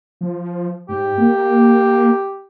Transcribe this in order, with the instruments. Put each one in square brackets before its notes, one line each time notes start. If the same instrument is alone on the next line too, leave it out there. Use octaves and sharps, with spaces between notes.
[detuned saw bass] F3
[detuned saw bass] G#2 [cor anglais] G4
[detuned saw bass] A#3